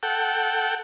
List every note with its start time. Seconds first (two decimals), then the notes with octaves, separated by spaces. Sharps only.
0.03 A4 F#5 G5